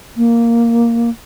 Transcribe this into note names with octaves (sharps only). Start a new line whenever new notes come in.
A#3